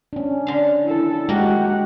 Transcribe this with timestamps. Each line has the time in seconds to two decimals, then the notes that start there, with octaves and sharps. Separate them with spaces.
0.13 C#4 D4
0.47 D3 F5
0.84 E4 A4
1.29 G#3 A#3 F#4 G4 A#4 F#5